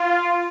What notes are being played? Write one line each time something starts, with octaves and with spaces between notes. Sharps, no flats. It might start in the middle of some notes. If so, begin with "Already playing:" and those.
Already playing: F4